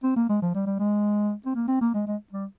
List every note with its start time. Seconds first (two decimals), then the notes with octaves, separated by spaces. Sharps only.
0.04 C4
0.16 A#3
0.29 G#3
0.42 F3
0.55 G3
0.67 G3
0.79 G#3
1.46 C4
1.55 A#3
1.68 C4
1.81 A#3
1.94 G#3
2.07 G#3
2.32 G3